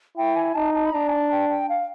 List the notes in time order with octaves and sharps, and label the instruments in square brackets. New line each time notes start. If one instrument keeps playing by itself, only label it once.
[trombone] E4 [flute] G5
[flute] G#5
[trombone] D#4 [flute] A5
[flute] A5
B5
[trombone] D4 [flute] A#5
[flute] G#5
A5
G5
G5
F5